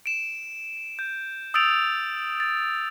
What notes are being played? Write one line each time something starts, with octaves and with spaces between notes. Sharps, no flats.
D7 E7
G6
D#6 E6 G6 A6 D7 F7
A6